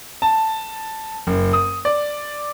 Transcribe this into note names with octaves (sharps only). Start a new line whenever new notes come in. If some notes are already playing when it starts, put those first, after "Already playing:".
A5
F#1
D#6
D5